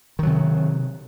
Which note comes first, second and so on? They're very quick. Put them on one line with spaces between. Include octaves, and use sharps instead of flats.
D#3 F#3 C3